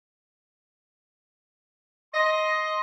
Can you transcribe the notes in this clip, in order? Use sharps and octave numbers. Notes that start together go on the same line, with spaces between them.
D#5 C6